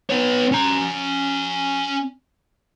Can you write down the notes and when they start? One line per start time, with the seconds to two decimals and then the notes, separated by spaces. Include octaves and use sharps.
0.10 B3 C#5
0.52 C#4 A#5